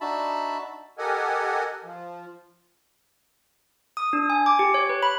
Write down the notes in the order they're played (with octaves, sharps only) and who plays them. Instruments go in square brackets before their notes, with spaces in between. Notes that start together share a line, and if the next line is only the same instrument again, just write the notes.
[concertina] D4 D#4 F#4 E5 A5 B5
[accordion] G4 A4 A#4 D#5 F#5 G#5
F3
[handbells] D#6
D4
G#5
D6
G4
C#5
B4
B5